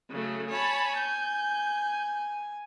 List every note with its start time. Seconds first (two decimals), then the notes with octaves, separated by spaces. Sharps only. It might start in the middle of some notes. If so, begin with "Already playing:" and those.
0.10 C#3 F#3 A3
0.50 C#5 G#5 A5 B5
0.97 G6